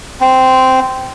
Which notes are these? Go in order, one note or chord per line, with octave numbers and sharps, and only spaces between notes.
C4